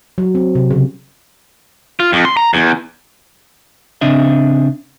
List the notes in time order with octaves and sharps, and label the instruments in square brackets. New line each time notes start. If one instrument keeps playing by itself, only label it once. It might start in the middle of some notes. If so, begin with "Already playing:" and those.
[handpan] F#3
C4
C3
C#3
[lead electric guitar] F4
F2
C6
A#5
E2
[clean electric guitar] C#3 C4 D4 D#5 E5